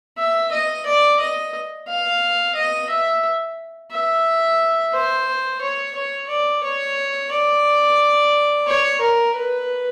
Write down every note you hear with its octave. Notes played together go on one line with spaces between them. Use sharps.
E5
D#5
D5
D#5
F5
D#5
E5
E5
C5
C#5
C#5
D5
C#5
D5
C#5
A#4
B4